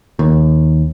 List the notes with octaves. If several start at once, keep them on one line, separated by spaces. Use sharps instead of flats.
D#2